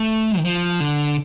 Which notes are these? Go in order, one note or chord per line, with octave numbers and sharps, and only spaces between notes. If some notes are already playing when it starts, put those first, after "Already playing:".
Already playing: A3
D#3
F3
D3